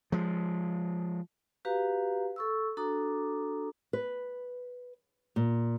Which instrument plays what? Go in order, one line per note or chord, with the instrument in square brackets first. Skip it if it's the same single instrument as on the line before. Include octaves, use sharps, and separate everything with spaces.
[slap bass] F3 G#3
[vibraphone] F#4 G4 B4 F5 A#5
A4 C#6 E6
D4 F#4 A4 A#5 D6 D#6
[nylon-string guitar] B4
A#2